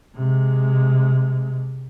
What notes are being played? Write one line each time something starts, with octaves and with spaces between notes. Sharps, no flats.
C3 G#3